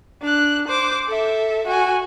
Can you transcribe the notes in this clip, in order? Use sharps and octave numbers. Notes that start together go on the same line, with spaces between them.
D4 F#6
C5 D6
A4 E5
F#4 G#5